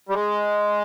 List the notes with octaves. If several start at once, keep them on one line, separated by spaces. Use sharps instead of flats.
G3
G#3